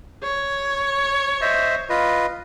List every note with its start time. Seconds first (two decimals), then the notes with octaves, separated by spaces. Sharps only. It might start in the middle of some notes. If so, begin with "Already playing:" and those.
0.23 C#5
1.41 C5 D#5 E5
1.90 F4 B4 D#5